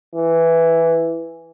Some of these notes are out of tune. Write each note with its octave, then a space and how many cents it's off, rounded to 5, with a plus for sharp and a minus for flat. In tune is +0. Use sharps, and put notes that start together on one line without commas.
E3 +5